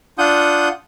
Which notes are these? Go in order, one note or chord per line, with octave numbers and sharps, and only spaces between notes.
D4 F4 F#5 D#6 G6